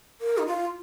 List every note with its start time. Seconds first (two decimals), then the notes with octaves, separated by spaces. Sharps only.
0.21 A#4
0.38 D#4
0.47 F4